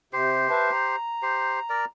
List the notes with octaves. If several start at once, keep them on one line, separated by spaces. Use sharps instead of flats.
C3 G4 C5
B4 E5 A5
A#5
G4 C5
A#4 D5